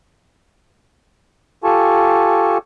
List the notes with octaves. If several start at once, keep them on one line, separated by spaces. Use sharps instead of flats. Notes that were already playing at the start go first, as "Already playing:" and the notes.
F4 G4 A4 G#5 A5 C#6